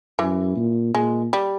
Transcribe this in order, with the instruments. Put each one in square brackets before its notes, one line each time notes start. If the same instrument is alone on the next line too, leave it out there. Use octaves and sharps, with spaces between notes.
[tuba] F#2 [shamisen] E3
[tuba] A#2
[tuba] A#2 [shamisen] G#3
[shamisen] G3